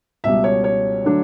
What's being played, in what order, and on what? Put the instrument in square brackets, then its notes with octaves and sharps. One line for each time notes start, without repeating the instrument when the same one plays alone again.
[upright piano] C#2 B2 G3 E5
C#5
C#5
D3 F#3 A3 D4